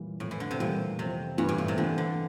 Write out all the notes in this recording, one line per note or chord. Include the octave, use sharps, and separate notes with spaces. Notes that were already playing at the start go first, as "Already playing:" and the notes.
Already playing: A#2 E3 G3
F2 A2
E3
D3
C3
A#2 E3 G3
F2 C3
G2 E3 G3
A2
A#2
C3
D3 E3
D3